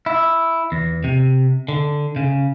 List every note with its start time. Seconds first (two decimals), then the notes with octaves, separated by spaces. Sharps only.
0.06 E4
0.72 E2
1.04 C3
1.68 D3
2.16 C#3